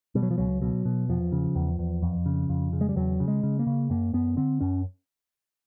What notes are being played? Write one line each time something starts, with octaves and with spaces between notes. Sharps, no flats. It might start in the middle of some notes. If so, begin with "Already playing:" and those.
B2 G3
F#3
F3
C#2 F#3
B2 F#3
B2
E2 F3
C#3
E2
E2
F2
C#3
F2
C#3
G#3
G3
E2 F#3
C#3
G#3
C#3
A#3
C#3
F#2 A#3
F#2 B3
D3 C4
F#2 C#4